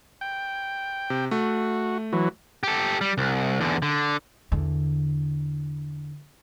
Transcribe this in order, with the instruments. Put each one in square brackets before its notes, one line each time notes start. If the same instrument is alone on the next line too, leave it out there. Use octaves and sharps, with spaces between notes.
[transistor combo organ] G5
[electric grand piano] C3
[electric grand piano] A3 [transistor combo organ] F#4
[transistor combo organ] E3 F#3
[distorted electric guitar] G4 A4
G3
C2
E2 D3
D3
[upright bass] E2 D3